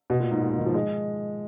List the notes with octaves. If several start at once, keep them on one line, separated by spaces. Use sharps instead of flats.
B2
A#2
G#2
A#2
B2
D#3
F3
G#3